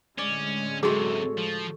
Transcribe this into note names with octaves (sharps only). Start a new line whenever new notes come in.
A2 D3 G#3 C#4 D5
F#2 C3 F#4 G#4 A4 C#5
F3